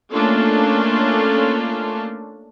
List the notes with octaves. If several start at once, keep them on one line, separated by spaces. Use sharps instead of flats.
A3 A#3 C#4 D4 F4 A4